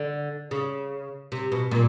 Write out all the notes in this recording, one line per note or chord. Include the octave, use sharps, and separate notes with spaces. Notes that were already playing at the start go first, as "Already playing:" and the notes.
Already playing: D3
C#3
C3
B2
A#2